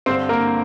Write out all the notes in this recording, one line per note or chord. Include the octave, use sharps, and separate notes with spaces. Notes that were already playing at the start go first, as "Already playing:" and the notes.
G2 D3 C4 C5
A#3 A#4